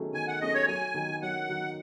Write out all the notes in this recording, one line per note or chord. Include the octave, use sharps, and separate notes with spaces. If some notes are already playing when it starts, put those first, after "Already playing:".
Already playing: D#3 F#3 A3 C#4 G#4
D#3 G#5
F#5
F#3 A3 C#4 G#4 D#5
C#5
F#2 G#5
D#3 F#3
F#2 F#5
D#3 F#3